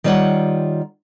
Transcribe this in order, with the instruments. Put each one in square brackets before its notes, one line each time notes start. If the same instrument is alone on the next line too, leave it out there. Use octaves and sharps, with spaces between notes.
[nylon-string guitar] D#3 G3 F4 C#5 F#5